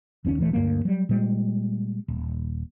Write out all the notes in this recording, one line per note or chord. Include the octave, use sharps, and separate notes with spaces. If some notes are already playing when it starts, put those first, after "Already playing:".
F#1 D#2 C4 C#4
D#1 E3 A3
D2 G2 G3 A#3
F#3 G3
A#2 G3 G#3
D#1